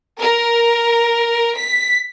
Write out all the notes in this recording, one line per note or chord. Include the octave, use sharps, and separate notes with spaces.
A#4
B6